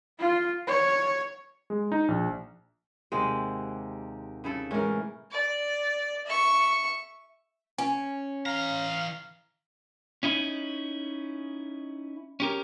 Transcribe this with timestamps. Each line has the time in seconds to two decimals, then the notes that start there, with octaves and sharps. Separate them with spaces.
0.19 F4
0.67 C#5
1.70 G#3
1.92 D#4
2.08 A#1
3.12 D#2 C3 G#3 F#5
4.44 C#3 E4 A4
4.71 A2 E3 G#3 C#4 A#4
5.31 D5
6.26 E5 C#6
7.78 C#4 G#5
8.46 E3 F5 A#5
10.23 C#4 D#4 E4
12.40 C#4 G4 A#4